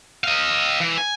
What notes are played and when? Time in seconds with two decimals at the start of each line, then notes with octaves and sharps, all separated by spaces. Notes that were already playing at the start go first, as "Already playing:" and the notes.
0.24 D#5 F5
0.80 E3
0.98 G#5